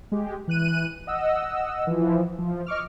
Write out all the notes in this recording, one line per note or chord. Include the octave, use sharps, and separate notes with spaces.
G#3 G4
E3 F#6 D#7
D#5 F#5 E6
E3 F3
F3
D#5 C#6 D6 F6